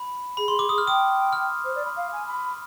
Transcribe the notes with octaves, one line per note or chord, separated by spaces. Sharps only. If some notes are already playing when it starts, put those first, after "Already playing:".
Already playing: B5
G#4 B5
G#4 C6
G#4 D6
G#4 D#6
F6
G5 D#6
F6
C5
D5
B5
F5
G#5
B5